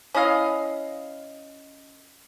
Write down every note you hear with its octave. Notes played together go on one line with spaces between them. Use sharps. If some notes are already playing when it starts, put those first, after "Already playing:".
C#4 E4 D#5 F5